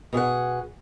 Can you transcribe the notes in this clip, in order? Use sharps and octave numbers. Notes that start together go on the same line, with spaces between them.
B2 G#4 C#5 F#5